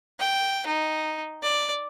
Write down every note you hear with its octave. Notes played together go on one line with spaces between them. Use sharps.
G5
D#4
D5